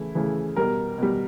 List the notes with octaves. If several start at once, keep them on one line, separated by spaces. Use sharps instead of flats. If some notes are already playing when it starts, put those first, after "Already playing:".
Already playing: C#3 E3 A3 E4
C#3 E3 A3
B2 G3 A#4
B2 G3